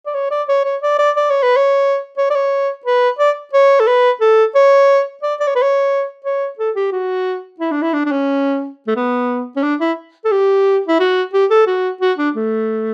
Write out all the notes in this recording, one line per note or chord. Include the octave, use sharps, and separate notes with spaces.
D5
C#5
D5
C#5
C#5
D5
D5
D5
C#5
B4
C#5
C#5
D5
C#5
B4
D5
C#5
A4
B4
A4
C#5
D5
D5
C#5
B4
C#5
C#5
A4
G4
F#4
E4
D4
E4
D4
D4
C#4
A3
B3
C#4
D4
E4
A4
G4
E4
F#4
G4
A4
F#4
F#4
D4
A3